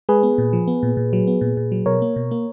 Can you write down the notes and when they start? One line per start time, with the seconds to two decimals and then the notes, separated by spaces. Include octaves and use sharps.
0.09 G#3 G#4 B4
0.23 B3
0.38 A#2
0.53 F3
0.68 B3
0.83 A#2
0.97 A#2
1.13 F#3
1.27 B3
1.41 A#2
1.57 A#2
1.72 F#3
1.86 B2 A#4 C#5
2.02 A#3
2.16 B2
2.31 A#3